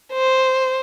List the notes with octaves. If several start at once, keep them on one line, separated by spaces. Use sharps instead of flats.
C5